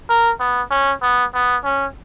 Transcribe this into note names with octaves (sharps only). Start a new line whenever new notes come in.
A#4
B3
C#4
B3
B3
C#4